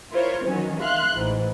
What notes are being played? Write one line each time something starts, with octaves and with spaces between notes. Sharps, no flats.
E4 F4 A#4 C5 C#5
D#3 E3 F#3 C#4
E5 F5 C6 F#6
A1 G#2 E3